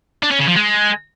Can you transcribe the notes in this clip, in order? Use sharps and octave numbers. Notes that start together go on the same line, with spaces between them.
D4
C#4
C#3
F3
G#3